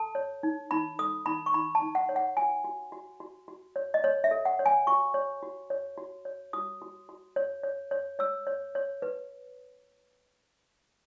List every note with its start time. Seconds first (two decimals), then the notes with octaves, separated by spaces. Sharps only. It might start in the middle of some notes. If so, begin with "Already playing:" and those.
Already playing: A4 A5
0.15 C#5
0.43 D#4
0.71 D#4 B5
0.99 A4 D#6
1.26 D#4 B5
1.46 C#6
1.54 D#4 B5
1.75 A5
1.82 D#4
1.95 F#5
2.09 C#5
2.16 F#5
2.37 F#4 G#5
2.64 F#4
2.92 F#4
3.20 F#4
3.48 F#4
3.76 C#5
3.94 D#5
4.04 C#5
4.24 E5
4.31 A4
4.45 F#5
4.59 C#5
4.66 G#5
4.87 F#4 C#6
5.14 C#5
5.43 F#4
5.70 C#5
5.98 F#4
6.25 C#5
6.53 F#4 D#6
6.82 F#4
7.09 F#4
7.36 C#5
7.63 C#5
7.91 C#5
8.19 C#5 E6
8.47 C#5
8.75 C#5
9.02 B4